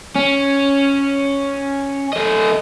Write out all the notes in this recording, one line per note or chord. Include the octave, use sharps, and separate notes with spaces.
C#4
A3 D#5